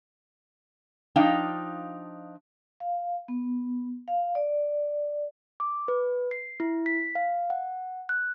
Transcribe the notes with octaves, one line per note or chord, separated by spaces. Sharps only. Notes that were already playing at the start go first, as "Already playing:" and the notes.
F3 D4 D#4 F5 G5
F5
B3
F5
D5
D6
B4
C7
E4
B6
F5
F#5
F#6